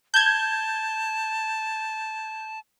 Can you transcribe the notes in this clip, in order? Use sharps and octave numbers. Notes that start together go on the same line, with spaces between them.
A5 G6 G#6